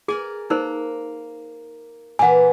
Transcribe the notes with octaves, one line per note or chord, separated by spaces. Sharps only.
G#4 A#4 D5 G#5
A#3 D#4 A#4 C5
A#2 E3 B4 F#5 G#5